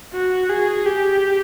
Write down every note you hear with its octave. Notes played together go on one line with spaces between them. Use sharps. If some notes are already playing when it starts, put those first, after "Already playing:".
F#4
G#4
G4